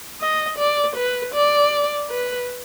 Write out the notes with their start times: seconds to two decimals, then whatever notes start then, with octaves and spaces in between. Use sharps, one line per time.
0.20 D#5
0.58 D5
0.96 B4
1.34 D5
2.10 B4